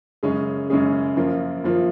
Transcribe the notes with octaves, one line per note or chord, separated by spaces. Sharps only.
F#2 C#3 G#3 C#4 G#4
F#2 C#3 G#3 C#4 G#4
F#2 F3 A#3 F4 A#4
F#2 F3 A#3 F4 A#4